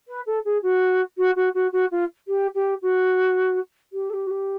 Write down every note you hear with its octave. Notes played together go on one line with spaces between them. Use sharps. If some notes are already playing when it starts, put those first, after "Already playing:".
B4
A4
G#4
F#4
F#4
F#4
F#4
F#4
F4
G4
G4
F#4
G4
A4
G4
F#4
G4